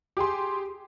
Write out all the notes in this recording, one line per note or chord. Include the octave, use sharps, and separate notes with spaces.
G4 G#4 C6